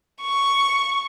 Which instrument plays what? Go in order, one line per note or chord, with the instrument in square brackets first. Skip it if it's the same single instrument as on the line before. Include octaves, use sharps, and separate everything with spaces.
[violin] C#6